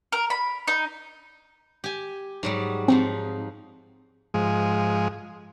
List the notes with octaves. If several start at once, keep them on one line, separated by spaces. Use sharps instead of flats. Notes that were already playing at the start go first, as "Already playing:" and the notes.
A#4
B5
D#4
G4 G#5
G#2 F#3 G3
G#2 F3 C4 D#4
G#2 F3 G#3